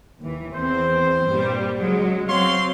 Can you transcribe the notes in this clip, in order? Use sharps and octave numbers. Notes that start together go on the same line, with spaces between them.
D#2 E3
E2 C4 C5
G2 A#2 G3
C#2 F#3 G#3
F#3 C4 C#5 F5 C6